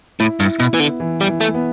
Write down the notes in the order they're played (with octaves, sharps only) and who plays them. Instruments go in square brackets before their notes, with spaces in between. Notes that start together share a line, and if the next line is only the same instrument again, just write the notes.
[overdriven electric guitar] A2 [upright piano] E4
[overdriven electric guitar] G2
[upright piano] E4
[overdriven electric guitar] B2
[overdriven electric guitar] E3 [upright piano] B3
[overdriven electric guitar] D3
[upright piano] E3
[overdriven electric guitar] G3
[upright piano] E3
[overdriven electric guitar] A3
[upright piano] B3